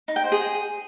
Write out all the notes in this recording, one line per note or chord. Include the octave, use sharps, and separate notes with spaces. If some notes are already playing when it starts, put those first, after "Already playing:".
D#4
G5
C5
G#4